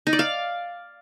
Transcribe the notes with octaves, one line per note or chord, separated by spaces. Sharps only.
D#4
D5
F5